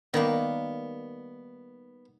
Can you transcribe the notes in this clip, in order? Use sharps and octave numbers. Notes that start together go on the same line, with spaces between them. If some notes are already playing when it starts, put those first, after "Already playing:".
D#3 G3 A#3 B3